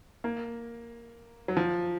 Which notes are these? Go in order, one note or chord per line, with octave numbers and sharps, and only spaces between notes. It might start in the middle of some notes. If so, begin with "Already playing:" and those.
A#3
F#3
F3